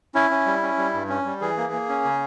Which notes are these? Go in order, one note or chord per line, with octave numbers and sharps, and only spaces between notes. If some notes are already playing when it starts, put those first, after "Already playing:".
C#4 E4
C#4
G3
C#4
G3
G2
C#4
G3
E3 G#4
A#3
A#3
C#4
C#3